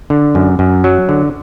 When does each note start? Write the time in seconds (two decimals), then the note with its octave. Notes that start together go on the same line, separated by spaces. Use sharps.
0.10 D3
0.35 F#2
0.59 F#2
0.84 F#3
1.09 D3